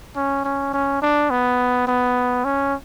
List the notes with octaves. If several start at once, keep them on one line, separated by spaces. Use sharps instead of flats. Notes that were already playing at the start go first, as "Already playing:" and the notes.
C#4
C#4
C#4
D4
B3
B3
C#4